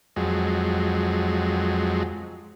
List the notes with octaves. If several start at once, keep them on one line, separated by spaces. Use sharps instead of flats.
F2 F#3 G#3